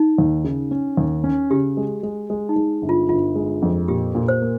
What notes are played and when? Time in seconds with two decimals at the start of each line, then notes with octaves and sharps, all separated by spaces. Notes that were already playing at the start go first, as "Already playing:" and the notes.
Already playing: D#4
0.18 D#2
0.44 C#3
0.71 C#4
0.97 D#2
1.24 C#4
1.50 C#3 G4
1.77 G#3
2.03 G#3
2.30 G#3
2.49 D#4
2.56 G#3
2.82 G1
2.89 F4
3.09 G1 F4
3.35 G#3
3.62 F2
3.88 A#2 G4
4.15 A#2
4.28 C5
4.42 A#3